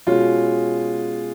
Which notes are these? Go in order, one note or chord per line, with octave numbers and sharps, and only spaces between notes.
B2 G#3 C#4 F4